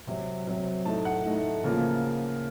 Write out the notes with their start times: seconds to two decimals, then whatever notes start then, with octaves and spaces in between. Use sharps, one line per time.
0.07 C3 F#3 C4
0.47 C3 F#3 C4
0.85 A2 A3 D#4 A5
1.05 F#5
1.26 A2 A3 D#4
1.64 C#3 F3 A#3 F4